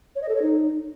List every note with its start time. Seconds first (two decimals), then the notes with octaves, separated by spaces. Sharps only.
0.15 C#5
0.22 D#5
0.28 A4
0.35 C#5
0.41 D#4